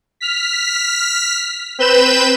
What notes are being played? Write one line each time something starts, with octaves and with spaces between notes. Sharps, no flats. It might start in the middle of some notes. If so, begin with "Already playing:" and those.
F6 B6
C4 B4 B5 G6 E7